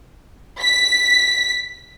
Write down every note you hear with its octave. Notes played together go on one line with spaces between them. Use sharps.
B6